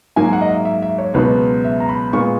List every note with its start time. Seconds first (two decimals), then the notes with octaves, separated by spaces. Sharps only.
0.16 G#2 F#3 A#3 G#5
0.33 F#5
0.41 D#5
0.49 E5
0.65 E5
0.82 E5
0.98 C#5
1.14 C#2 B2 F#3 B3 B4
1.64 E5
1.80 A#5
1.89 B5
2.13 A#2 G#3 B3 C#6